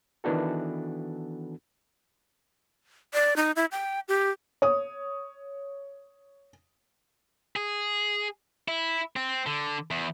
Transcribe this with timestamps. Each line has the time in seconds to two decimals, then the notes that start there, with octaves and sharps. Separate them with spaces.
0.24 D#3 E3 B3 D4 F#4 A4
3.14 D5
3.36 D#4
3.56 E4
3.72 G5
4.08 G4
4.62 C#5 D#6
7.56 G#4
8.68 E4
9.16 C4
9.46 D3
9.91 E2